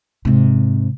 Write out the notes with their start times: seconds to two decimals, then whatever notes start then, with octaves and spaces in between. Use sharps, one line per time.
0.25 G#2 C3